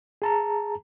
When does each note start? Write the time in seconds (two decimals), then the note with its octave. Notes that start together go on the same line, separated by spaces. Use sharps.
0.22 G#4 A5 A#5